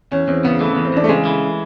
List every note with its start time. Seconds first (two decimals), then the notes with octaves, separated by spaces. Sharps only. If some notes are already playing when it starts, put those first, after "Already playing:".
0.12 E2 C#4
0.28 E2 C4
0.44 C#3 B3
0.61 E3 A3
0.73 E2 B3
0.85 C4
0.93 E2 D4
1.04 A3
1.09 C#3 G#3
1.25 E3